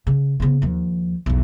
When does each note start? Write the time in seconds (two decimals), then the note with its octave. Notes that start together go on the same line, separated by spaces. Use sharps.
0.07 C#3
0.40 C#3 B3
0.62 D#2 F3
1.26 B1 E2